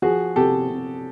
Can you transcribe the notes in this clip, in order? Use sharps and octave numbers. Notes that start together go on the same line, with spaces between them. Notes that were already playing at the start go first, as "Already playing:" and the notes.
F3 F#4 G#4
C3 G4 A4
C3